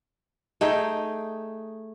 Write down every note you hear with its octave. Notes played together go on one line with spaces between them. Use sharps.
A3 D#4 G#4 G5